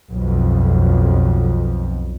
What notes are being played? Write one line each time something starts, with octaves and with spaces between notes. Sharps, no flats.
B1 F2